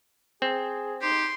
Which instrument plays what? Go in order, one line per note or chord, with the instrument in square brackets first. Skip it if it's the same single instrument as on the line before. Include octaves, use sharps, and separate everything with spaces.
[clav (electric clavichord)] C4 [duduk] G#4
[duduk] D#4 [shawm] G4 [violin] C6